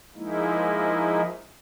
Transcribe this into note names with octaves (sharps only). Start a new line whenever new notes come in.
F3 G#3 A#3 D#4 E4